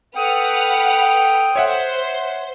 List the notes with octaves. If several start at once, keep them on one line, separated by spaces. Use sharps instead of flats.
A4 B4 F#5 G5 D#6 F6
C5 C#5 E5 F#5